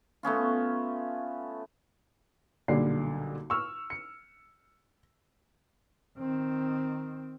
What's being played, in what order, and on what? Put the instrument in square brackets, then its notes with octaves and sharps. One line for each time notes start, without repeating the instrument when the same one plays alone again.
[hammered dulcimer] A3 B3 C#4 F4
[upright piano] B1 A#2 D3 G3 D5 C7
C#6 E6 F6
C#7
[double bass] D#3 C4